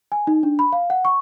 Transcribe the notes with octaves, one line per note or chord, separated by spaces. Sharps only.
G#5
D#4
D4
B5
F5
F#5
C#6